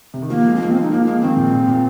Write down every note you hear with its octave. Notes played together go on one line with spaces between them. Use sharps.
C3
D#3
F3 A#3
G#3
F3 C4
G#3 A#3
C4
D#4
F3 A#3
G#3 A#3
D#3 C4
A#2
A#2
A#2